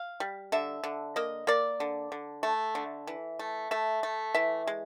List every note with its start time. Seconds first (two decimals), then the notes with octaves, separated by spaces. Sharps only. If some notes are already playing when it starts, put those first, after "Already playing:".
Already playing: F5
0.20 G3
0.52 D3 E5
0.84 D3
1.16 A#3 D#5
1.47 A#3 D5
1.80 D3
2.12 D3
2.43 A3
2.75 D3
3.07 E3
3.39 A3
3.71 A3 E5
4.03 A3
4.35 E3 E5
4.67 G#3